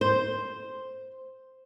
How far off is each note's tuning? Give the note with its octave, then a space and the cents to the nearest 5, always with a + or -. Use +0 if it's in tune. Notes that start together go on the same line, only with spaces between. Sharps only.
C5 +0